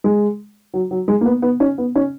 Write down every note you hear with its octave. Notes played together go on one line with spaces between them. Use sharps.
G#3
F#3
F#3
G#3
A#3
B3
B3
C#4
B3
C#4